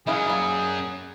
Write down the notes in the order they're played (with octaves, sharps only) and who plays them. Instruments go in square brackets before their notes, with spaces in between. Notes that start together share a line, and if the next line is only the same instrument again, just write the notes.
[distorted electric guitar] F#2 F#3 [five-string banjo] E4 D#5 F5 [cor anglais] G#4
[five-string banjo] G3 A#3